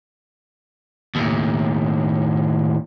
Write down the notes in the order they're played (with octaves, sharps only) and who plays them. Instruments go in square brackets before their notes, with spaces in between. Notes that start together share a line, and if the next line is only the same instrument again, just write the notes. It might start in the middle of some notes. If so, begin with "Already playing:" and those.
[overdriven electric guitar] D#2 A2